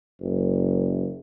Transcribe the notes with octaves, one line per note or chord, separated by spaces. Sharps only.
F#1